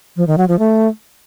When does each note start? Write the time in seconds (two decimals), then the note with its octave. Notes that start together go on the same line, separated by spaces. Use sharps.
0.17 F3
0.27 D#3
0.38 F#3
0.48 F3
0.59 A3